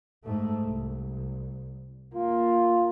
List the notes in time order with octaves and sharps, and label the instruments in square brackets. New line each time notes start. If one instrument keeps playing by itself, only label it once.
[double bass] G#2 A3
C2
[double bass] A#3 [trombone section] F4